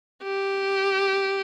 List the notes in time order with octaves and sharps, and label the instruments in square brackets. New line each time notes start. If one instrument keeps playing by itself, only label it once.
[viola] G4